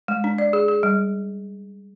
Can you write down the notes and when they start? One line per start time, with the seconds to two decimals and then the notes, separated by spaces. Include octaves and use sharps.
0.08 G#3
0.24 D4
0.38 D5
0.53 G#4
0.68 G#4
0.83 G3